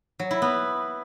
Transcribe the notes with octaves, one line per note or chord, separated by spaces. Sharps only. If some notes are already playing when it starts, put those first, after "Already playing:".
F#3
E4
B3